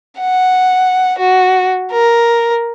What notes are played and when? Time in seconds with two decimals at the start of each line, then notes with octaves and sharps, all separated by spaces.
0.21 F#5
1.19 F#4
1.92 A#4